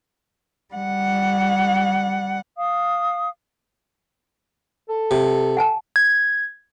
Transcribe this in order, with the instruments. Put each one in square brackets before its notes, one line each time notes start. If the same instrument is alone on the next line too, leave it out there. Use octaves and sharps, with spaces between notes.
[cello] G3 F#5
[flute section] F5 D#6
[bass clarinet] A4
[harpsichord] C3
[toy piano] F#5 G#5 A5
[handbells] G#6